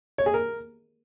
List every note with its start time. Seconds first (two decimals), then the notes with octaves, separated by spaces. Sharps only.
0.18 C#5
0.26 G#4
0.34 A#4